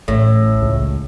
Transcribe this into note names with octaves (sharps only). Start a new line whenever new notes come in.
A1 A2
C#2